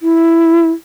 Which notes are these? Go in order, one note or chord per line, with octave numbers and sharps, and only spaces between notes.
E4